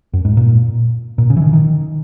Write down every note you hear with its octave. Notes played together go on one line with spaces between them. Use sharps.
F#2
G#2
A#2
A#2
C#3
E3
D#3
D#3